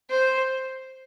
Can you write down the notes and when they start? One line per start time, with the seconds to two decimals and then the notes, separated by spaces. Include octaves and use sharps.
0.10 C5